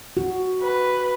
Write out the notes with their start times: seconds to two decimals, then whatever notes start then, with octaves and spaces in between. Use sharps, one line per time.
0.17 F#4
0.62 B4